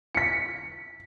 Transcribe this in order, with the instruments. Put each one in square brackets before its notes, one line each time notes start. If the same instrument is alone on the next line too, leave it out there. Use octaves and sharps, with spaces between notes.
[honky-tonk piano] B6 C#7